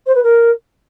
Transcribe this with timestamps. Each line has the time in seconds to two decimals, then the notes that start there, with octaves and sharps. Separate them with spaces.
0.06 C5
0.15 B4
0.23 A#4